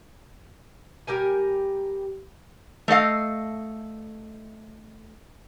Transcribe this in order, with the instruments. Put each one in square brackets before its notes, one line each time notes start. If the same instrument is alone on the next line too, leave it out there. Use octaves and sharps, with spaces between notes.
[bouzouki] G3 G4 A#4 G#5
[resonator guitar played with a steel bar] A3 A4 D#5 F5